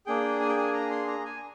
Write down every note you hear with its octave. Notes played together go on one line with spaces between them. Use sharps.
A#3 D4 G#4 G5
G#5
G5
G#5
A#5
C6
A#5
G#5